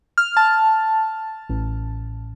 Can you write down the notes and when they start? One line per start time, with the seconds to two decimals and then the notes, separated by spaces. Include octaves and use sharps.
0.18 F6
0.37 A5
1.50 A1